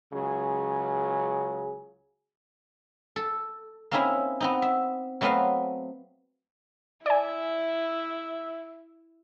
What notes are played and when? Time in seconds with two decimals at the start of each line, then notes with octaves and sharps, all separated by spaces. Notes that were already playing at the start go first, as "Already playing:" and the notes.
0.13 C#2 C#3 F#3 G#4
3.16 A4
3.91 A#3 C4 C#4 D#4 E4 E5
4.40 B3 C4 D#4
4.62 E5
5.21 F#3 A3 B3 C4 B4 F5
7.06 E4 D5 E5 G#5